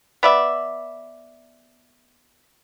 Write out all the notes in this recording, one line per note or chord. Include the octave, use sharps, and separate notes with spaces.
B3 D5 E5